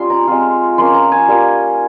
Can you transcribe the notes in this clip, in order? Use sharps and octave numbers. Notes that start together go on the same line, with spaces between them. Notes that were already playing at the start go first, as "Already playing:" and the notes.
Already playing: G3 C#4 D#4 F4 C6
A#5
G#3 C4 F4
F3 A#3 C#4 C6
A#5
G#5
G3 A#3 F4